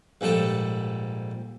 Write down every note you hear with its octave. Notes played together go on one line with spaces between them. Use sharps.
A#1 G#2 G3 A4